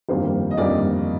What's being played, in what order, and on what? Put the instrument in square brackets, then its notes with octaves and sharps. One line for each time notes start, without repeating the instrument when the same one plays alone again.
[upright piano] G1 F2 D#3 G3 A#3 C5
D#5
G1 F2 D#3 G3 A#3 D5